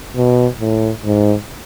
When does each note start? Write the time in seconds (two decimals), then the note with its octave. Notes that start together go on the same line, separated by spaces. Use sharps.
0.16 B2
0.60 A2
1.04 G#2